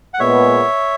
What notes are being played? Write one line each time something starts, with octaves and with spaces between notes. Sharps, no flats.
F#5
A#2 G#3 B3 C#5 E5